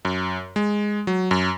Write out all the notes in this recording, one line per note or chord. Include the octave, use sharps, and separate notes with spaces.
F#2
G#3
F#3
F#2